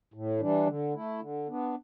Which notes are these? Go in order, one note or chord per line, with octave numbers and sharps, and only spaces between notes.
A2
E3 G3 D4
D3
A3 E4
D3
B3 D4